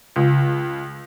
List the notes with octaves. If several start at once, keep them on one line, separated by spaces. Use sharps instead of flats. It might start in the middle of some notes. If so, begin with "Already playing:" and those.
C#2